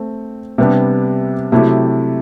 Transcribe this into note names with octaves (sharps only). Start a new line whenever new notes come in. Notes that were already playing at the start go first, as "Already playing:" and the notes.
Already playing: A3 C4
C3 G3 B3 D4
C3 F#3 A3 E4 G4